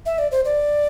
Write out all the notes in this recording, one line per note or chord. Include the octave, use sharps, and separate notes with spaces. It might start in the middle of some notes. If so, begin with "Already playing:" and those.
E5
D5
C5
D5